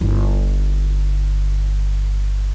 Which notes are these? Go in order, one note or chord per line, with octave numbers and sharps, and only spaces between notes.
G1 E4